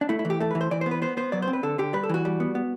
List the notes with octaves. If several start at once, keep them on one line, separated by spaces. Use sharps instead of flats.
D4
A3 E4
E4
E3
G4
A3 A4
B4
E3
C5
E3 D5
C5
B3
B4
B3 C5
B3 C5
F#3 D5
C5
C4
B4
D3 A4
D3 G4
G3 B4
A4
E3 F#4
G3
B3
B3